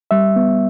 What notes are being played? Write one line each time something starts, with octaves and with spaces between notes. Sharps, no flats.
G3 E5
B3